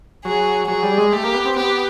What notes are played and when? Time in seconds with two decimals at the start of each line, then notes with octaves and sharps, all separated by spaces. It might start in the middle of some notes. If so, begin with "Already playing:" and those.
0.25 F#3 G#4
0.68 F#3 G#4
0.83 G3
0.98 G#3
1.12 A3 G4
1.24 A#3
1.34 B3
1.45 C4
1.56 B3 G4